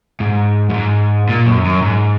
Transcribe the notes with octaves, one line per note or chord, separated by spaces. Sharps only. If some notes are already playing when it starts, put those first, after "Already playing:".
G#2
F#2
G#2
A#2
F#2
F#2
G#2